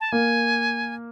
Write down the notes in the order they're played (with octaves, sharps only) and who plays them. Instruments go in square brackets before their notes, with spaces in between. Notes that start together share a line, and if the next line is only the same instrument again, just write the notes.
[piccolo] A5
[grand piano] A#3 [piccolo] G#5